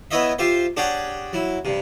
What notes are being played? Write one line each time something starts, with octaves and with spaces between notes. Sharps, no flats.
B3 E4 C#5 D#5 E5
F4 G4 C5 E5
D4 G4 G#4 C#5 F#5 G5
F#3 E4
G2 C3